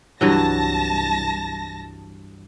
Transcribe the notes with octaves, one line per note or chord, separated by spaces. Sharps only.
C2 G2 E3 F#3 A5 A#6